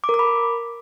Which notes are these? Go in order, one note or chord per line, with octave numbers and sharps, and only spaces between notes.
D6
A#4
D6
B5